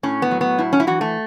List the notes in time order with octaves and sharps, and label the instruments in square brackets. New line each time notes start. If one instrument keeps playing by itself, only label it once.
[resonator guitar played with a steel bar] A2 C#4
B3
F#3
B3
A2 E4
C#4
E4
E3 F#4
A3